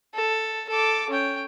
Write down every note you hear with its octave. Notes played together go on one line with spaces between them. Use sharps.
A4
A4 D6
C#4 G5